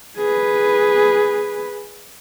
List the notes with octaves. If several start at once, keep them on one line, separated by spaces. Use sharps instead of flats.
G#4 B4